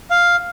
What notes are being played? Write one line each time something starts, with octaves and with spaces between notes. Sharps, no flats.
F5